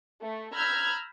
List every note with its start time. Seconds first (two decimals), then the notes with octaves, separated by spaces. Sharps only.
0.22 A3
0.54 A#5 B5 E6 F6 G6 G#6